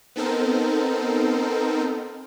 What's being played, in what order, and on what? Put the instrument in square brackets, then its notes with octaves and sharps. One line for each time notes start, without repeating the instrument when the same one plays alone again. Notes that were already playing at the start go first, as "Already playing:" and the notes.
[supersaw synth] B3 C4 D#4 A4 A#4 C5